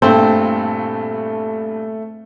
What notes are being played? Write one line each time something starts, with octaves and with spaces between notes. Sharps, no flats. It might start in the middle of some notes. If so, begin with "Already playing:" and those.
G2 A#2 A3 C4 A4